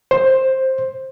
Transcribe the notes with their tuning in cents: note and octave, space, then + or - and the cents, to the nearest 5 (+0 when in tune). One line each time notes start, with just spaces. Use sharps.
C5 +10